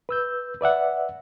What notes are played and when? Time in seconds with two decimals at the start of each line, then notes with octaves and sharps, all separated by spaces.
0.09 B4 E6 G6
0.61 B4 D5 E5 F#5